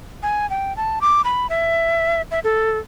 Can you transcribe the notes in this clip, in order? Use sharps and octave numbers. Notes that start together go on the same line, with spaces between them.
G#5
G5
A5
D6
B5
E5
E5
A4